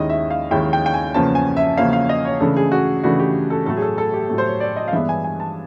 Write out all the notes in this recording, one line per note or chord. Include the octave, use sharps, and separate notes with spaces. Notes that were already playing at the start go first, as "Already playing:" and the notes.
Already playing: D#2 D#3 G#3 C#4 E4 D#5
E5
F5
D#2 D#3 G#3 C#4 E4 G5
G5
G5
G#5
E2 C#3 F3 A#3 C#4 A5
G#5
E5
E2 C#3 F3 A#3 C#4 F5
F5
D#5
C#5
C#3 E3 A3 D4 A4
G#4
F#4
C#3 E3 A3 D4 F#4
G4
A4
A2 F#3 A3 A4
G#4
A4
A4
G4
A2 F#3 A3
C5
C#5
D5
D#5
F5
G2 E3 G#3 B3 D4 E5
G#5
G#5
A5